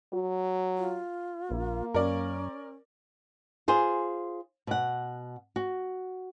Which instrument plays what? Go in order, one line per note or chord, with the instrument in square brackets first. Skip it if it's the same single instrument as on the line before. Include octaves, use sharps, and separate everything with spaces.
[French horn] F#3 [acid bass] F#4
[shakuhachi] F4
[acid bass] A#1 [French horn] A#3
[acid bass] F#2 [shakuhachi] C#4 [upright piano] A#4 D5
[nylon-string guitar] F4 G#4 C5
B2 F#5
F#4